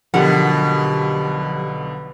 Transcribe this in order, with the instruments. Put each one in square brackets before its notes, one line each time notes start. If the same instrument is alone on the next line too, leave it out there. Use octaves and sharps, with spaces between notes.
[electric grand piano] B1 D3 A#4 [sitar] B2 [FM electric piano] F3 G4 [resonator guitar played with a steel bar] F#5